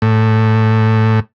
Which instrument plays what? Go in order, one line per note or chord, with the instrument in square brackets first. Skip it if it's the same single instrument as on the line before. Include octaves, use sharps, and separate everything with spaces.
[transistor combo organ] A2